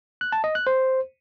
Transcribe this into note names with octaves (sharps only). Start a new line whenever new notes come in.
F#6
A5
D#5
F#6
C5